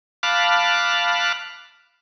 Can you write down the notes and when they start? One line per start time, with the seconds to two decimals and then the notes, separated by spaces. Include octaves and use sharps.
0.23 F5 A5 B5 D6 F6 F#6